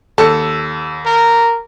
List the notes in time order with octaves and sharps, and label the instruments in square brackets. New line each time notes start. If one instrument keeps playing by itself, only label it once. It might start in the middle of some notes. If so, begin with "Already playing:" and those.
[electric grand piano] D#2 E6 C#7 [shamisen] A4
[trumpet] A#4